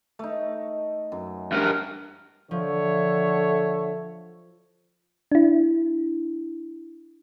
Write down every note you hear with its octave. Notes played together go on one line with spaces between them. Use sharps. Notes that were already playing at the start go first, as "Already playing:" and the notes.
A3 D#4
F#2
G2 A#4
D3 F3 A4 C#5 E5
D4 E4